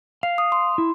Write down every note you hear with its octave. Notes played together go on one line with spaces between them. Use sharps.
F5 C7
D#6
C6
E4